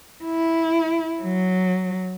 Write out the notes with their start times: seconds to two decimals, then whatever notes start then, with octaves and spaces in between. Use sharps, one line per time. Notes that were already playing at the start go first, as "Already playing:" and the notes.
0.25 E4
1.23 F#3